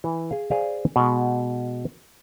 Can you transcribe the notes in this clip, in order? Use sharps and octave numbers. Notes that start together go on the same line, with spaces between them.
E3
G#4 F5
G#4 C5 D5 F5
B2 G#3